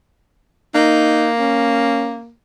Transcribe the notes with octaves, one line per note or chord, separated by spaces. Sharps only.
A#3 D#4
C#4